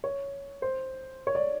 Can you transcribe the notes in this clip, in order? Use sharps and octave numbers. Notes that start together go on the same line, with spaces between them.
C#5
C5
C#5
D5